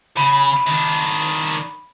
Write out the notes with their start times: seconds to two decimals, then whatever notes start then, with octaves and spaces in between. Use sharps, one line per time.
0.17 C#3 B5
0.67 D#3 D4